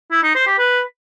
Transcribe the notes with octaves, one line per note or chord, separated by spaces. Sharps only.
E4
D#4
C5
G4
B4